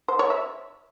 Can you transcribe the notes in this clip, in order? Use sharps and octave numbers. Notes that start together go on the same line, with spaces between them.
C5
C#5
E5